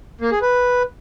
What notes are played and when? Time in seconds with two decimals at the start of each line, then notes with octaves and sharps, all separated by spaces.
0.21 A#3
0.31 G#4
0.41 B4